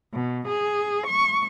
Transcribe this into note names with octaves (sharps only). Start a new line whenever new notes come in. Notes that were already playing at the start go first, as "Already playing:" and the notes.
B2
G#4
C#6